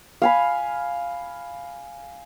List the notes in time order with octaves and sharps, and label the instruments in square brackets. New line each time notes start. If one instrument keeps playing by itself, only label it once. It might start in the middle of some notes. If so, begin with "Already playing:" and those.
[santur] F5 G#5 B5